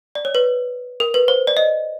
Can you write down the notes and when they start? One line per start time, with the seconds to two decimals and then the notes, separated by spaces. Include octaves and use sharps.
0.15 D5
0.25 C#5
0.35 B4
1.00 A#4
1.14 B4
1.28 C5
1.47 D5
1.57 D#5